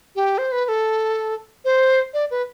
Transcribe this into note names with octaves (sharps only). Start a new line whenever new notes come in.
G4
C5
B4
B4
A4
C5
D5
B4